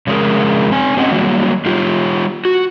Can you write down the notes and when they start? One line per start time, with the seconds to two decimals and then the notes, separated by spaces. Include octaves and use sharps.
0.07 F2 C#3 G#3 A#3 G#4 A#4
0.72 C4 G#5
0.97 C4 C#4 G4 D#5 F#5 G5
1.10 D#3 F#3 G3 A#3
1.66 G3 F4 G4
2.45 F#4